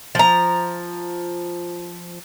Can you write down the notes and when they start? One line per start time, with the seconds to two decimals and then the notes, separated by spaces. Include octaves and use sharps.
0.15 F3 A#5